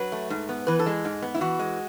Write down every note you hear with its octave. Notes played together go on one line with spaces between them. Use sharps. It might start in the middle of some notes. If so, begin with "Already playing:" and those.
Already playing: F#3 B4
A3
G#2
B3
E3 B4
A4
G#3
G#2
B3
E4
E3 F#4
G#3